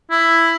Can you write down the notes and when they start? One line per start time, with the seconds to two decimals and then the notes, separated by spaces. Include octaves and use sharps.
0.11 E4